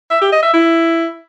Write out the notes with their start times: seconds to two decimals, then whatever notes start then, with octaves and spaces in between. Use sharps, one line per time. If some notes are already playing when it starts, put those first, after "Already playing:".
0.11 E5
0.21 G4
0.32 D#5
0.43 E5
0.54 E4